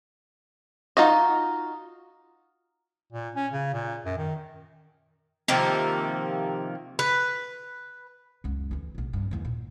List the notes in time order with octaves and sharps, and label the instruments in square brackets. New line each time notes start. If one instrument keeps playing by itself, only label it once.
[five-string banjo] D#4 F4 F#4 D#5
[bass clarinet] A#2
C#4
C#3
A#2
F#2
D#3
[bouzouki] C3 D#3 F3 A#3
B4
[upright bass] C#2 F#2
D2 E3
A#1 B2
G2 C#4
D#2 E3
A#2